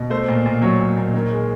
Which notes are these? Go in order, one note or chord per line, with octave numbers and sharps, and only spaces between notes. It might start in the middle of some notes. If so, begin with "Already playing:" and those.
Already playing: B2
A3 C5
A#2
A#2
F#3 C#5
A#2
A#2
D#3
G#3